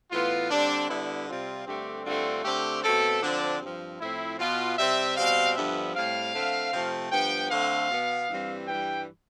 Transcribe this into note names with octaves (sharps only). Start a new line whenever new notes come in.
A2 E3 B3 F4
D3 G3 C4 D4
D3 G3 B3 E4
C3 G3 C4 F4
G2 D3 A3 C4 G4
G2 D3 A3 C4 F4
D3 A3 C4 G4
B2 A3 C4 A4
D3 F3 C4 D4
G2 F3 C4
A2 F3 C4 E4
B2 B3 F4
C3 G3 C4 E5
B2 G3 C4 F5
G2 D3 F3 B3 E5
A2 G3 C4 F5
D3 A3 C4
C3 F3 A3
G2 F3 B3 G5
D3 A3 C4 F5
B2 B3
G2 E3 G3 C4
G2 E3 G3 G5